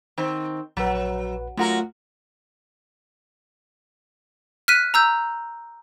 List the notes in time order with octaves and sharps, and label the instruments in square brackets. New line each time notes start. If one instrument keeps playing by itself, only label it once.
[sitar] D#3 C4
[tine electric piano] A#1 B4 [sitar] F#3
[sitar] F#2 F#4 A#4 [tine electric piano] A3 F4
[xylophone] F6 F#6 B6 D#7
A#5 E6 G6